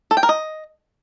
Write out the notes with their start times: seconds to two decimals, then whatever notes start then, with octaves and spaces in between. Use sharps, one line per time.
0.11 A4
0.17 G5
0.23 A#4
0.29 D#5